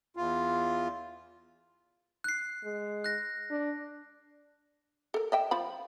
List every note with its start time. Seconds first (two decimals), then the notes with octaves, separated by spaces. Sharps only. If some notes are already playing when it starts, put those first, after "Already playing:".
0.17 E2 F4
2.24 F#6 C7
2.64 G#3
3.04 F#6 A#6
3.51 D4
5.14 A4 A#4
5.32 D#5 E5 G5
5.51 F3 F4 B5